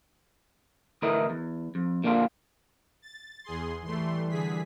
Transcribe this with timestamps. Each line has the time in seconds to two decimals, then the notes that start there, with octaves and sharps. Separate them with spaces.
1.02 D2 A2 E3 A3 A#4 D#5
1.30 E2
1.75 F2
2.04 A#2 D3 A#3 D4 F4
3.02 A6
3.44 E2 G#4 C6
3.85 E3 G3 A3 C6
4.30 D3 G#4 B6